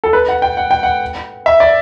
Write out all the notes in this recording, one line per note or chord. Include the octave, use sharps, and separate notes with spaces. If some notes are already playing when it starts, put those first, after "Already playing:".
A4
B4
F#5
G5
F#5
G5
F#5
E5
D5